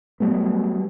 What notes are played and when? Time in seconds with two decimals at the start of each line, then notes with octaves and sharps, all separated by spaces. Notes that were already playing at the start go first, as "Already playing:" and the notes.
0.20 F#3 G3 A3 B3